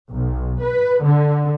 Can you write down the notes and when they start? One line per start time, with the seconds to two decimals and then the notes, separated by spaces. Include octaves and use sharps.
0.11 B1
0.62 B4
1.03 D3